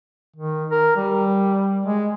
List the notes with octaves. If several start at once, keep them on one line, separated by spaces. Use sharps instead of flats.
D#3
A#4
G3
G#3